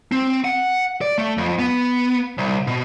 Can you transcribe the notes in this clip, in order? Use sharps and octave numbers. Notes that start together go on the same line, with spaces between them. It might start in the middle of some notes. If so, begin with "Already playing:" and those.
C4
F#5
D5
A3
F2
B3
C2
B2